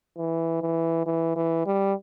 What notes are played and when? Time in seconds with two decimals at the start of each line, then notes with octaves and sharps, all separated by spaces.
0.17 E3
0.62 E3
1.06 E3
1.36 E3
1.66 G3